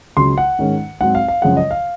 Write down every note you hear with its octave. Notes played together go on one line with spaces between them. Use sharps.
C#2 C#3 F#3 C6
F#5
G#2 D#3 G#3 C#4
G#2 F#3 C4 F#5
F5
F5
F#2 C#3 F3 G#3 C#4 F#5
D#5
F5